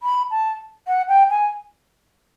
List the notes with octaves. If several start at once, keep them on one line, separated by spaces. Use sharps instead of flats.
B5
A5
F#5
G5
G#5